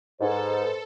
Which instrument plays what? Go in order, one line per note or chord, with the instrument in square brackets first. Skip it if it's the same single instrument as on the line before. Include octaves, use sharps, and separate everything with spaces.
[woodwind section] G#2 [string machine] A4 [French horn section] B4 C5